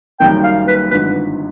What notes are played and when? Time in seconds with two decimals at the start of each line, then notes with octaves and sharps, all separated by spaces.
0.20 F#1 F#2 D#3 G3 A#3 G5
0.43 F5
0.67 B4
0.90 G#1 G2 D3 F3 B4